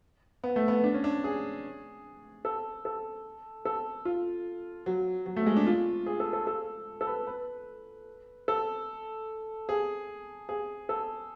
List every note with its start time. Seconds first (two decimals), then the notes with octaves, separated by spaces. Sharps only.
0.44 B3
0.56 A3
0.68 B3
0.84 D4
0.94 C#4
1.04 D4
1.24 G#4
2.45 A4
2.85 A4
3.65 A4
4.05 F4
4.86 F#3
5.26 F#3
5.36 A3
5.46 G#3
5.57 D4
5.67 F4
6.06 G#4
6.20 A4
6.33 A4
6.47 A4
7.01 A4
7.07 B4
7.27 B4
8.48 A4
9.69 G#4
10.49 G#4
10.89 A4